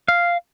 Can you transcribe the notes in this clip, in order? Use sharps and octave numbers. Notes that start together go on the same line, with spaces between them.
F5